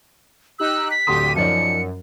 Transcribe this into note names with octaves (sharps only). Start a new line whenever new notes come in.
D#4 G4 E6 F#6
B6
D1 D3 G4 C6 D#6 D#7
F#2 F3 D#4 D5 C#7